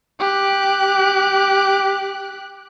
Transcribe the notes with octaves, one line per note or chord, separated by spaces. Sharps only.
G4 F#6